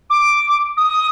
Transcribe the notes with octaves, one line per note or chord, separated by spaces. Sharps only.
D6
D#6